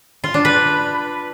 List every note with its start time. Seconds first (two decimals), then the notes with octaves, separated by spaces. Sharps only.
0.24 F4
0.34 D4
0.45 B4